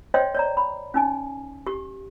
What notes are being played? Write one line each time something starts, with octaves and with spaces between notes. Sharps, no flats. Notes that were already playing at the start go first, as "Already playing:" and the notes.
C5 C#5 D#5 F5 G5 C6
C#5 D5 A#5
B5
C#4 D#4 G#5
G4 C#6